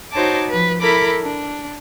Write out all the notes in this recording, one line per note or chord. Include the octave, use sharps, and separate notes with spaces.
D#4 F#4 C5 C#5 A5 D6
F3 B4
E4 A4 A#4 B5 D6
D4